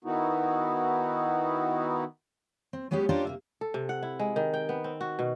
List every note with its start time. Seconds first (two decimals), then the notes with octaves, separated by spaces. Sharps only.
0.04 D#3 B3 D#4 E4 F#4
2.73 C4
2.91 F#3 G#3 B3 C#4 G4
3.09 C#4 D4 F4 G4 A#4 C5
3.25 C3 A#3 E5
3.61 A4
3.74 C3
3.89 F#5
4.03 E4
4.19 G#3
4.36 D#3
4.54 G5
4.69 B3
4.84 C4
5.01 F#4
5.19 B2